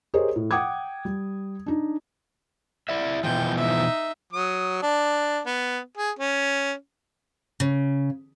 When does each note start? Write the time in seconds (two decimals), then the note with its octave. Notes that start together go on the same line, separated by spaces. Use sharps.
0.14 G4 G#4 A#4 C5 C#5 D#5
0.36 A2
0.51 F#5 G5 D6 D#6 G#6
1.05 G3
1.66 D4 D#4
2.89 E4 D5 E5
3.23 B2 E3 F3 G5
3.58 D#4 E5
4.33 F#3 D#6
4.82 D4
5.46 B3
5.97 G#4
6.19 C#4
7.60 C#3